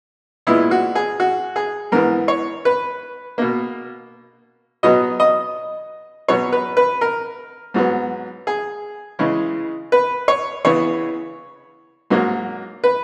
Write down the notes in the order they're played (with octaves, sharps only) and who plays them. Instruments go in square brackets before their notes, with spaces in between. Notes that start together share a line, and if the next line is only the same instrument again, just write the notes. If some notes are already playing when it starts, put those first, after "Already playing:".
[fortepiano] A#2 G#3 B3 E4
F#4
G#4
F#4
G#4
G#2 E3 B3 A#4
C#5
B4
B2 A#3
B2 F#3 B3 D#5
D#5
B2 F#3 B3 C#5
B4
B4
A#4
G#2 F#3 B3
G#4
C#3 E3 G#3
B4
C#5
C#3 E3 B3 C#5
G#2 F#3 A#3
B4